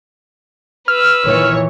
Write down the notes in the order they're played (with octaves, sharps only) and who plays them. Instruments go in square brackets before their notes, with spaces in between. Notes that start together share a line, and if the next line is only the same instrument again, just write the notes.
[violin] B4 E6 [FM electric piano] F6
[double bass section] A#2 D#3 E3 [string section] C#5